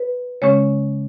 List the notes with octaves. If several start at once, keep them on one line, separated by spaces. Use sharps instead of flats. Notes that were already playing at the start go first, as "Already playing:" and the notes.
Already playing: B4
C#3 G#3 C#4 C#5